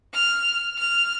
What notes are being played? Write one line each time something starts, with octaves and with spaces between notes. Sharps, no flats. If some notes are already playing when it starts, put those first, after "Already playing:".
F6
F6